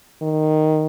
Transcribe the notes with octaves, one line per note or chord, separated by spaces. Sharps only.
D#3